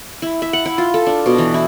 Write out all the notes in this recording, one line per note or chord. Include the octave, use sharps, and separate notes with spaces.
E4
E5
F#5
E4
F4
A4
D4
B2
E3
E4